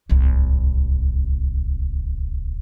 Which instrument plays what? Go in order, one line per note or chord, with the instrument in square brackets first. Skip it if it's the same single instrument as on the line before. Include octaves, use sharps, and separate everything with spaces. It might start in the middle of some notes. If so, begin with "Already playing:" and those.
[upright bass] D1 C2